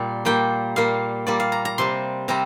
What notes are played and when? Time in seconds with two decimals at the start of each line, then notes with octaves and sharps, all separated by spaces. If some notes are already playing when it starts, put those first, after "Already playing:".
Already playing: A#2 G3 A#5
0.25 A#2 G3 A#3 G5
0.76 A#2 G3 A#3 F5
1.27 A#2 G3 A#3 D5
1.40 F5
1.52 A#5
1.65 A#5
1.78 C3 G3 C4 C6
2.28 C3 G3 C4 A#5